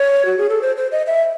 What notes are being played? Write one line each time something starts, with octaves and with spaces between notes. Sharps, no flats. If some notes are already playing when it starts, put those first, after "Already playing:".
Already playing: C#5
F#4
G#4
A4
C5
C5
D#5
E5